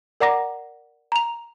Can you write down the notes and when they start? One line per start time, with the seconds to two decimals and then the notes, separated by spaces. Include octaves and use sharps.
0.20 A#4 D5 F#5 A#5 D6 A#6
1.12 A#5 F7